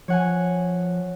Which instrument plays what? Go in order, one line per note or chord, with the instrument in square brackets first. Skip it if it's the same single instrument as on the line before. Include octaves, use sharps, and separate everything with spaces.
[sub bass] F3 [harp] C#5 F#5 G#5